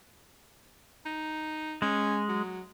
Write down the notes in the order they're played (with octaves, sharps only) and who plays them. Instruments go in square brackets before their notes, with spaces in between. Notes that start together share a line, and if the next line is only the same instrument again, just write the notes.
[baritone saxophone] D#4
[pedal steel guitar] G#3 [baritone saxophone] C#4
[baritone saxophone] F#3